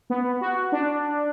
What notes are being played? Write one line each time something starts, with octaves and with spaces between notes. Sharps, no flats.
B3
F#4
D4